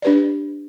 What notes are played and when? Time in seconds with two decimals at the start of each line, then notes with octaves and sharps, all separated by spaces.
0.02 D4 G4 B4 D5